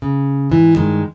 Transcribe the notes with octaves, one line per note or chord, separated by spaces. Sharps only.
C#3
G#2 E3
G2 D#3 G#3